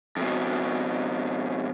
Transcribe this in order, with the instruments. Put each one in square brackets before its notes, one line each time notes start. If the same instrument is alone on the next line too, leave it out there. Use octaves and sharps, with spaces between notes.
[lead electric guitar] F2 B2